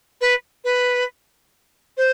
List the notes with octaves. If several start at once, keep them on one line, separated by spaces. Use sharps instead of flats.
B4
B4
C5